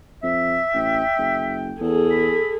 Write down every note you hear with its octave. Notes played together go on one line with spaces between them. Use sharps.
F2 E5
A1 G5
F#1
E2 G#4 A4
B5